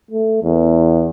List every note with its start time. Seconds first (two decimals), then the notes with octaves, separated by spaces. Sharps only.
0.11 A3
0.44 E2